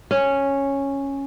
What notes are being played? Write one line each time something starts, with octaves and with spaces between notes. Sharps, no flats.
C#4